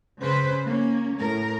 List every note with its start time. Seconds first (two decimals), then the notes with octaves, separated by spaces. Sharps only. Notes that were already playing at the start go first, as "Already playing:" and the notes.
0.21 C#3 B4 C5
0.65 A#3 C#4
1.18 A2 A#4